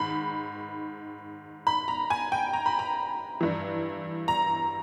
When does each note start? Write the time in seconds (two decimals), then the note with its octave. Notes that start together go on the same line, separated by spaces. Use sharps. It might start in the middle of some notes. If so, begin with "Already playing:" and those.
Already playing: G#2 D#3 B5
1.67 B5
1.88 A#5
2.10 G#5
2.32 G5
2.53 A#5
2.66 B5
2.79 A#5
3.41 G2 E3
4.28 A#5